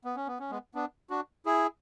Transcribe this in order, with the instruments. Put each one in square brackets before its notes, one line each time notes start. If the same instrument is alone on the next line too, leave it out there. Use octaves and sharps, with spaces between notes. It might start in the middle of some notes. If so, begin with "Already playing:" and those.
[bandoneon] B3
C#4
B3
C#4
G#3 B3
B3 D4
D4 F#4
E4 G#4